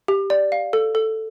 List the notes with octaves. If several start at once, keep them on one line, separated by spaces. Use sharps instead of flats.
G4
D5
F5
A4
A4